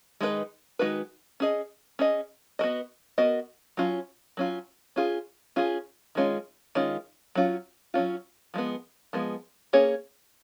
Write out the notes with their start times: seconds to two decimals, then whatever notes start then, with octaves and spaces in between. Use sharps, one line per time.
0.21 D#3 G#3 D#4 F#4 B4
0.79 D#3 G#3 D#4 F#4 B4
1.40 C#4 G#4 D#5
1.99 C#4 G#4 D#5
2.59 B3 F#4 A#4 D#5
3.18 B3 F#4 A#4 D#5
3.77 F#3 C#4 F4
4.37 F#3 C#4 F4
4.96 C#4 F4 G#4
5.56 C#4 F4 G#4
6.15 D#3 G#3 C#4 F4
6.75 D#3 G#3 C#4 F4
7.35 F#3 C#4 F4
7.94 F#3 C#4 F4
8.54 F3 G#3 B3
9.13 F3 G#3 B3
9.73 A#3 C#4 G#4 C#5